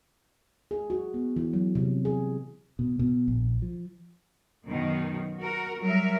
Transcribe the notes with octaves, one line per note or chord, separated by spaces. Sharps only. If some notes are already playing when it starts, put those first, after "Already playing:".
G#4
F#4
B3
E3
F#3
C3
G#4
B2
B2
A#1
F3
F#2 B2 D#3
F#4 A#4
F#3 G3 A#4 E5